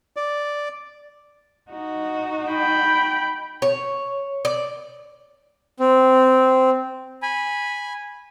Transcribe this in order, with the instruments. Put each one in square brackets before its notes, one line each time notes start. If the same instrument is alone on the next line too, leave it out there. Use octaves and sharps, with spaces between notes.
[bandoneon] D5
[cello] D#4 F#4
[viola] G5 B5
[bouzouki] C#5
D5
[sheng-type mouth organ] C4
G#5 B5